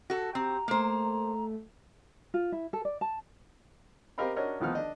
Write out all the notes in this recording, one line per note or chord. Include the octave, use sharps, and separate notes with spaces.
F#4 A4
C4 G4 A#5
A3 A#3 C5
F4
E4
A4
D5
A5
C4 G4 A#4 D#5 F5 B5
C#4 D4 F#4 A#4 C#5 D#5
D2 D#3 F3 B3 D#4 F6
D4 D#5